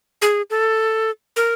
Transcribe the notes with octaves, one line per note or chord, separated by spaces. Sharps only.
G#4
A4
A#4